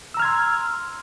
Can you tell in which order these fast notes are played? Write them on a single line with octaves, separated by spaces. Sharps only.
E6 A#5 F6 G#6 C6